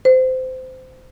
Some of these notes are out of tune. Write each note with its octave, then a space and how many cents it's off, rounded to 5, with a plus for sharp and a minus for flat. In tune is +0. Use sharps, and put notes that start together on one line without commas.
C5 -20